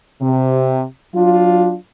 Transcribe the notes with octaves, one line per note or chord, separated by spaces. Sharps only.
C3
F#3 D4 F4